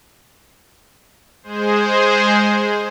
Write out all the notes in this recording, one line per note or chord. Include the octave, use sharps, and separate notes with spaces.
G#3 G#4 C5